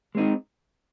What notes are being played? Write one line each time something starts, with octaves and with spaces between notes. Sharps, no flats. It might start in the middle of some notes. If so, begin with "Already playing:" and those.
G#3 C4 D#4